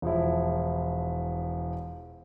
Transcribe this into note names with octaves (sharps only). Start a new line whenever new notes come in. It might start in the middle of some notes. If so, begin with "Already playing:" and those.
E1 F3 E4